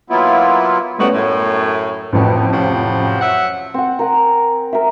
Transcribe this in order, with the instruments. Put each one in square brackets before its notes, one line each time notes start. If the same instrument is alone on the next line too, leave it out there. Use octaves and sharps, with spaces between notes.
[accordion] F#3 A#3 B3 E4 F4
[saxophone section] G3 D#4 F#4 [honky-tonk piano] A3 B3 C#4
[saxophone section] F#2 A2 [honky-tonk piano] C#5
[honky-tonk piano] A1 F2 [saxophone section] B2
[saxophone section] C3 F3 F#3
F#3 E5 F#5
[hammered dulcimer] C4 F#5
A#4 F#5 G#5
A#4 E5